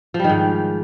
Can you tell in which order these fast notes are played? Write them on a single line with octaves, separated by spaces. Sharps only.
F3 G3 D#3 G#2